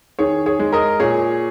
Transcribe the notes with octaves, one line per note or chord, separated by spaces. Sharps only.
D#3 G#4 C#5
G#4 C#5
G#3
A#4 D#5
A#2 G#4 C#5